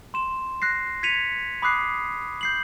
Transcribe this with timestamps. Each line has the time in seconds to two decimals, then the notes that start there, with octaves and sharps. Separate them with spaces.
0.14 C6 E7
0.62 F#6 A#6 C7
1.03 G#6 B6 C#7 D#7 F7
1.62 B5 D6 D#6 F#6 C7
2.41 G6 C7 F#7